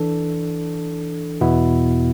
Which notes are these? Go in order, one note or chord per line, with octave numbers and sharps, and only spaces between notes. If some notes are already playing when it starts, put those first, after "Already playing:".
Already playing: E3 D4 A4
E2 B2 B3 E4